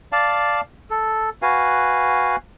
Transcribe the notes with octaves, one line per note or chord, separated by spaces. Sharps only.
D5 F5 A5
A4
F#4 B4 F5 G#5